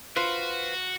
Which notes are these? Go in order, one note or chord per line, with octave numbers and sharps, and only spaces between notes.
F4 F#4 B4 C5